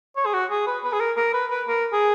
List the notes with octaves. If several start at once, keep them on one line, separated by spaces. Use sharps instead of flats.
C#5
G#4
F#4
G#4
B4
B4
G#4
A#4
A#4
B4
B4
A#4
G#4